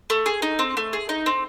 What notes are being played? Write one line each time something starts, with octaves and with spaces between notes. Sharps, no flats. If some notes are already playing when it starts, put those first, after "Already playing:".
A3
G#4
D#4
C4
A3
G#4
D#4
C4